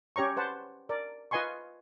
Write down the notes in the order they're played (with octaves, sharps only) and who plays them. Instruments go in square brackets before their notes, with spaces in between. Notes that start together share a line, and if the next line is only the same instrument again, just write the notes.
[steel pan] C#4 G4 C#5 A#5 C#6
B4 C5 F#5 A5
A#4 D5
F4 B4 D#5 G#5 C6 C#6